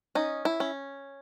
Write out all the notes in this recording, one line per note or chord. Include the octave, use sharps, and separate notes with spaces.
C#4 D#4
E4
C#4